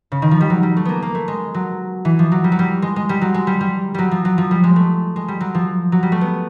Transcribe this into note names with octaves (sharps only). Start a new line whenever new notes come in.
C#3
D#3
F3
G3
F#3
G3
A3
A#3 B3
A#3
A3
G#3
F#3
E3
F3
F#3
G3
F#3
G3
G#3
G#3
G3
F#3
G#3
G3
G3
F#3 G3
F3
F#3
F3
G3
G#3
A3
G#3
G3
F#3
F3
F#3
G3
A3
B3